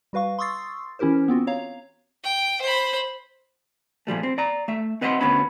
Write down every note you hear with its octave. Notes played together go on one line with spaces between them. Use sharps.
G3 F#4 B4 F5 C#6
C6 C#6 D#6 E6 A6 C7
E3 C#4 E4 G4 A#4 C5
B3 C4 F4 F#4
C#5 F5 A#5
G5
C5 B5
A#2 F3 G3 A3
C4
D5 A#5
A3 E5
C4 B4 D#5 E5 F#5 C6
D2 B3 C#4 B5